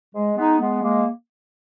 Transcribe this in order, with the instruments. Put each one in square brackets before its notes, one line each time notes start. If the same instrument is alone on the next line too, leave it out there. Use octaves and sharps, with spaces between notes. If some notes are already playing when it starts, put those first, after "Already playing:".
[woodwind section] G#3
G#3 B3 D#4
G#3 B3
G#3 A#3